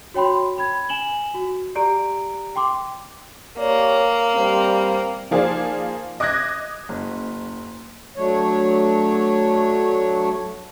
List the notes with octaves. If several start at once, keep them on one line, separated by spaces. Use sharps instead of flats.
F#4 C#5 G5 B5 C6
B5 G#6
G#5 E7 F#7 G7
F#4
G4 D5 A#5 D7
G5 C6 D6
A#3 G4 C#5 D5
G3 C4
F3 A#3 D#4 G#4 C5 D5
D#5 D6 D#6 F#6 G#6 A#6
F#1
F#3 A3 D4 C#5